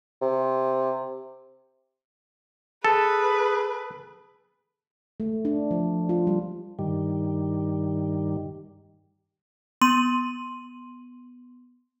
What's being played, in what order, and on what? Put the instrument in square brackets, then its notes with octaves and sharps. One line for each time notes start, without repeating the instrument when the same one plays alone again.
[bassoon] C3
[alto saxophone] G#4 [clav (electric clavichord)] A4 [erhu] B4
[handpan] A3
D4
F3
F4
G3
[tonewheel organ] G2 D#3 G3
[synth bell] B3 C6 D#7 F#7